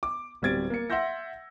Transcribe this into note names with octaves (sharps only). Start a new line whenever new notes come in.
D6
D1 G3 C4 G#6 A6 D7
A#3 C#7
E5 F#5 C6 E6 G6 A#6